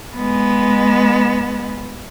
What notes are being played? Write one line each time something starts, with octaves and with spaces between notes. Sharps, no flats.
G#3 B3